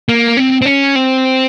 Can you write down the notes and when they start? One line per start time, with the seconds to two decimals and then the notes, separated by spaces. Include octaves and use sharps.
0.09 A#3
0.37 C4
0.62 C4
0.66 C#4
0.96 C4